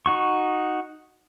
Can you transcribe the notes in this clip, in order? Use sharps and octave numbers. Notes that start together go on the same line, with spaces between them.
D#4 F#4 C#6